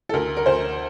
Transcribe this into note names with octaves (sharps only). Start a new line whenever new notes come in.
A4
D2 A#4
A#4
D2 C5